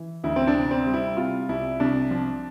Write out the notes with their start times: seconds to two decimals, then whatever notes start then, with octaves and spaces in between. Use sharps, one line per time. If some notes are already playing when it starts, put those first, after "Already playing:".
Already playing: E3
0.24 D2 E4
0.36 C4
0.47 D4
0.55 C3
0.71 C4
0.86 G3
0.94 E4
1.17 C3 F4
1.49 C2 E4
1.80 C2 D4
2.11 F3